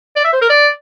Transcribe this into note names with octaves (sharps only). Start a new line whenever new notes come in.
D5
E5
C5
A#4
D5